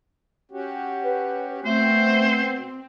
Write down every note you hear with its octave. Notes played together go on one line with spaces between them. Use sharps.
C#4 F#4 G4
B4
B2 A3 C4 C5